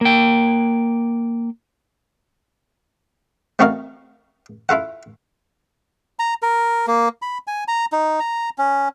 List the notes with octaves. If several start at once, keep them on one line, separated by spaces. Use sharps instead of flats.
A#3 G5
A3 C4 F#4 A#4 D#5 F5
E4 F4 A4 F#5
A#5
A#4
A#3
B5
G#5
A#5
D#4
A#5
C#4